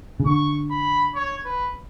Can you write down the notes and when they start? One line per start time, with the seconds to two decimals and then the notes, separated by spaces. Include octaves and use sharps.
0.20 C#3
0.26 D3 C#6
0.71 B5
1.15 C#5
1.45 B4